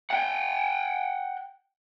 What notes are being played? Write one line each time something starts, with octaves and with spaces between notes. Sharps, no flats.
F#5 G5